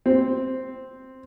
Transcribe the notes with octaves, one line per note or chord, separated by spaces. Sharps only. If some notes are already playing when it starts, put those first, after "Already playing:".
C4